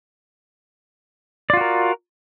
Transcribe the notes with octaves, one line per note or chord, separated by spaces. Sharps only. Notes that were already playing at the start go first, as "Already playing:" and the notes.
F4 F#4 A#4 D5